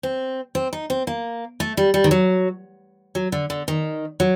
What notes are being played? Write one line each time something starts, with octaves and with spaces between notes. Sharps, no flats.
C4
C4
D#4
C4
A#3
A3
G3
G3
D#3
F#3
F#3
D3
D3
D#3
F#3